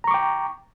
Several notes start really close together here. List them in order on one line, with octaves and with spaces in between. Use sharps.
A#5 C#6 D6 G5